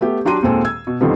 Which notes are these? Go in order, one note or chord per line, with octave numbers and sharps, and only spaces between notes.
A3 B3 G4
F#3 D4 G4 A#5 C6 D#7
D#2 A#2 G#3 C4 A4 G#5
E6 G#6
B2
F2 D3 D#3 F3 G3 B3